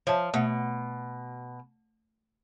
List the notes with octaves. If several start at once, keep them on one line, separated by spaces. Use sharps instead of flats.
F3 C#5 E5 A5
B2 A3 E5 F#5